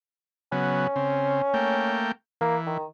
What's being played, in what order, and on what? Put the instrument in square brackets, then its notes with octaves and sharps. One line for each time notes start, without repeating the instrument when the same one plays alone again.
[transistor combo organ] C#3 F#3 B3 [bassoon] C#4
[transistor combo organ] C#3 C4
A3 A#3 G5
[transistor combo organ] E3 [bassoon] A#3
[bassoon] D#3